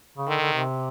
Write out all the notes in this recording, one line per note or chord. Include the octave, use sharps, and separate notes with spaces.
C#3
D3 D#3
D3
C3